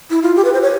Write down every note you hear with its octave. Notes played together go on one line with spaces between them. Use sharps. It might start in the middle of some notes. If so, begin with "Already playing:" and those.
E4
F4
G4
B4
C5
C#5